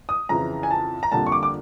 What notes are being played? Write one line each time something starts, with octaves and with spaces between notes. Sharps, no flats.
D#6
F2 C#3 E3 A#5
G#5
A5
A#5
F2 D3 G3 A#3 A5
C#6
D6
D6